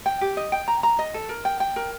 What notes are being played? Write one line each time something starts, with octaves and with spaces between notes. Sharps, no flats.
G5
G4
D#5
G5
A#5
A#5
D#5
A4
A#4
G5
G5
A#4